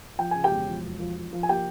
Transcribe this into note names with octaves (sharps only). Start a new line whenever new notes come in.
F3 G5
C#3 G#5
G4 G5
E1
F3
E1
F3
F3
F3
G#5
A#3 G4 G5